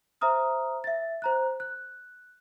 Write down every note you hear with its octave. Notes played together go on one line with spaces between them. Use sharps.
C5 E5 A#5 D#6 F6
E5 A6
C5 A#5 F#6
F#6